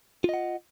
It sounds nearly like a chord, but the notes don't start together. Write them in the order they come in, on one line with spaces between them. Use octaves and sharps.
F4 D#5 F#5